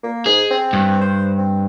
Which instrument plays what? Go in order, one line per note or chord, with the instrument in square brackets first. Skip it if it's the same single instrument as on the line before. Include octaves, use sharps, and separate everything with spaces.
[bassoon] A#3
[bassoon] G#2 [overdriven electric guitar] G#4
[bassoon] C4
[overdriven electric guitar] G2
[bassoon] C5
C4